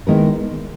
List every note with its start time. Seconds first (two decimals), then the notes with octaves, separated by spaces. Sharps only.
0.07 D#3 G#3 B3 E4 A#4